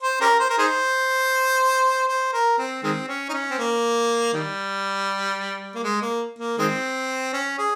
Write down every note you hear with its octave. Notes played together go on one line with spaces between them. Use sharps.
C5
C#4 G4 A#4
C5
A#4
D#4 G#4 C5
C5
A#4
C4
D#3 G#3 C4
C#4
D#4
C#4
C4
A#3
D#3 G3
A#3
G#3
A#3
A#3
D#3 G#3 C4
C#4
G#4